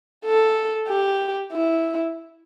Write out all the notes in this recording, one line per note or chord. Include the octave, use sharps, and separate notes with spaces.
A4
G4
E4